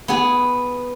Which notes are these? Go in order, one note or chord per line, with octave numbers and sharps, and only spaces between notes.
B3 G#4